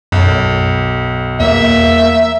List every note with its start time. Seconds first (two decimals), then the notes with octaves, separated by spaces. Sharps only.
0.12 B1 F#2
1.40 E2 A#3 E5